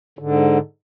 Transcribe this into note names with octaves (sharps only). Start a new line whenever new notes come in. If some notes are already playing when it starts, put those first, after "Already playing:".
G#2 D3